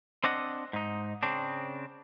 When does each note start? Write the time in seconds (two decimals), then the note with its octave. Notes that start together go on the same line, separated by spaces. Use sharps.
0.24 C4 D4 D#5 F#5
0.73 G#2 D#4
1.23 C#3 C4 D4